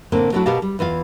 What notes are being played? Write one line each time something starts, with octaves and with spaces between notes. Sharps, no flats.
A2 D3 A#3 C4
F#3 G3 A3 D4 E4 F#4
B2 B3 G4 A#4 F5 A5
G3
E2 E3 F4 F5